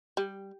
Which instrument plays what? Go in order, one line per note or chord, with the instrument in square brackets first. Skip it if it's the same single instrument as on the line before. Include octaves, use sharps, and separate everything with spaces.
[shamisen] G3